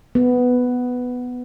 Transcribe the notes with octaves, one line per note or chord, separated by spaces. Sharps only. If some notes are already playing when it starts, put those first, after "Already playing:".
B3